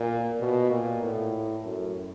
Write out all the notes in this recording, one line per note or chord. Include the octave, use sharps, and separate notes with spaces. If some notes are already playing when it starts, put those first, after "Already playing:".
Already playing: A#2
B2
A#2
A2
F#2